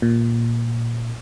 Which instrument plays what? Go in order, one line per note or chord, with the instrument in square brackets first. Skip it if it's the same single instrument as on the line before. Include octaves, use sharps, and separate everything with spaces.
[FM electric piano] A#2